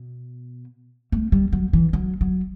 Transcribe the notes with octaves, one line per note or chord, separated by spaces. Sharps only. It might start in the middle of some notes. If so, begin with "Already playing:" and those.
Already playing: B2
A3
G3
F#3
E3
F#3
F#3